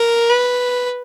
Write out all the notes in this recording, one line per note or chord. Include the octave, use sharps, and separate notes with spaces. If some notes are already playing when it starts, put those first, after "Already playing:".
Already playing: A#4
B4